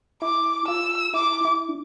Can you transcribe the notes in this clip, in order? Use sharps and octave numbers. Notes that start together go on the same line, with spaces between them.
E4 D6
F4 E6
E4 D6
E4
D4